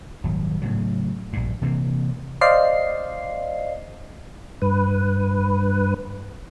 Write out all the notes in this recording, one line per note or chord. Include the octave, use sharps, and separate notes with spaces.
D#1 G#1 F#3
A2 C#3 F#3
A#1 G2
C3 E3 F3 A#3
C5 D5 D#5 F5 C7
G2 B4